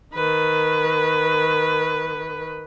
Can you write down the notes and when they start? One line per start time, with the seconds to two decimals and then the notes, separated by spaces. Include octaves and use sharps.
0.14 D#3 B4